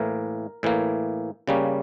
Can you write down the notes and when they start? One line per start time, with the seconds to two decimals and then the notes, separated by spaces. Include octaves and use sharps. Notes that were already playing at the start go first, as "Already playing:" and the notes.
Already playing: A2 E3 A#3 A#4
0.63 A2 E3 A#3
1.47 C#3 G3 A#3 C#4